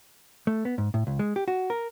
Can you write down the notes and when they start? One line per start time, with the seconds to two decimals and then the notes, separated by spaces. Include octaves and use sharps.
0.47 A3
0.65 B3
0.78 G#2
0.94 A2
1.07 C#2
1.19 G#3
1.36 G4
1.48 F#4
1.70 A#4